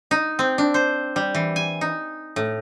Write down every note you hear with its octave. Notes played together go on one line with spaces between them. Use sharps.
D#4
C4
D4
C5
G3
E3
G#5
D#4
A2